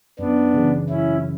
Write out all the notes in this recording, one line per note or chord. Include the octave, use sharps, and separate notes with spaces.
F#2 B3 D4
C#3 E3
F#2 C#4 E4